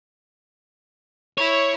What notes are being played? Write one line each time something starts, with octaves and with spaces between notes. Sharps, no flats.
E4 C#5